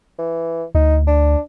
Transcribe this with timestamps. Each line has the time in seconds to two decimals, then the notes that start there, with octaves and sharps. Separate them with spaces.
0.18 E3
0.75 D2 D#4
1.07 D4